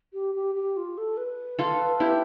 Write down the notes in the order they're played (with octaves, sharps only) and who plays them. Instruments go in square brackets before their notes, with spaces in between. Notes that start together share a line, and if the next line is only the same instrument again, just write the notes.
[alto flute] G4
G4
G4
F4
A4
B4
[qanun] F4 A4
E4 G4